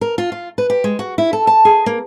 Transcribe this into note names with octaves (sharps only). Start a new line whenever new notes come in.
A#4
F4
F4
B4
G4
G#3
F#4
E4
A4
A5
G#4
A#3